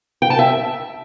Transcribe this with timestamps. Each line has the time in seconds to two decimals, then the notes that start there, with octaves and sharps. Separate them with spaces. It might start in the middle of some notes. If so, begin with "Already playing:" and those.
0.22 G5
0.30 A5
0.39 E5